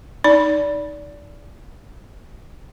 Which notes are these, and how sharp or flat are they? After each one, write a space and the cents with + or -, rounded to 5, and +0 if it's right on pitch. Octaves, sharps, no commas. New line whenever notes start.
D#4 +0 D5 -20